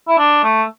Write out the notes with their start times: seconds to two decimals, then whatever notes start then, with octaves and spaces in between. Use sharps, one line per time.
0.08 E4
0.18 D4
0.44 A3